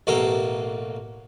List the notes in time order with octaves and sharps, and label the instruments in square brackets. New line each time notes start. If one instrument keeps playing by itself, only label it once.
[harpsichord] A1 B2 A#3 A4